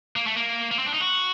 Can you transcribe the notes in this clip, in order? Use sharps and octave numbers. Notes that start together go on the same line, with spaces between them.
A#3
A3
A#3
A#3
C4
D4
D#4
F#4